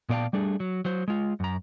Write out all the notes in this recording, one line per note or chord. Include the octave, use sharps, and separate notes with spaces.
A#2 B3 D5 F5 G5 A5
G3 A3 D4 G#4
F#3
F#3 C5
G#3 F4
F#2 A#5